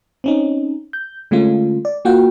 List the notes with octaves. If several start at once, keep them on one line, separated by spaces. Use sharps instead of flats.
C4 C#4 D#4
G6
D3 G#3 A3 C#4 F4
D5
A#3 F4 F#4 F#5 G5